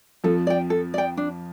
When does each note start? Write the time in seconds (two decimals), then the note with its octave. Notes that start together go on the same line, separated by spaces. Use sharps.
0.24 F2 F3 A4
0.47 D5 G5
0.70 A4
0.94 D5 G5
1.17 D4